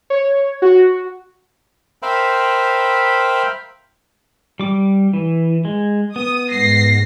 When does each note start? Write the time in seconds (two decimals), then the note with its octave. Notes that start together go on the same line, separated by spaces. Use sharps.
0.10 C#5
0.62 F#4
2.02 A#4 C5 E5 F5 G5 B5
4.60 G3 D6
5.13 E3
5.65 G#3
6.16 B3 D#6
6.51 G#2 A#6 C7